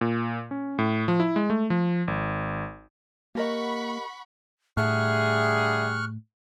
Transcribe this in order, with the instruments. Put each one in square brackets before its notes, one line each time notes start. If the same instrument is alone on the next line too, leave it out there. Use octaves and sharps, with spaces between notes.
[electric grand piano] A#2
C#4
A2
F3
E4
G#3
A3
F3
G#1
[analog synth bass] A#3 [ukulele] G4 A#4 D#5 [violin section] F#5 B5 C#6
[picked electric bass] A2 [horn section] D3 G3 G#4 [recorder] E5 [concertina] C#6 F6 F#6